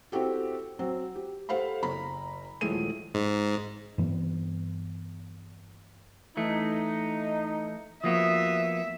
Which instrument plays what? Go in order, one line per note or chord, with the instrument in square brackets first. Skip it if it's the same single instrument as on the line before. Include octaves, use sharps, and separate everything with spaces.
[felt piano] C4 E4 F#4 G4 A4
F#3 C4
G4
G4 A4 C5 F5 F#5 B5
F#1 A#5 B5
D#1 E3 F3 G#3 A3 D#7
[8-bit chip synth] G#2
[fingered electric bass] G2 E3 B3
[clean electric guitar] E3 A3 [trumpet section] D#4
[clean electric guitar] F3 A#3 B3 [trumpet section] F#4 D#6 [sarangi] E5